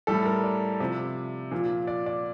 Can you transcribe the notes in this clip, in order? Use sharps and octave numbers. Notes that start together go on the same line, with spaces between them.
A2 G3 A4
A#4
D5
C3 F3
A#2 F3
D5
D5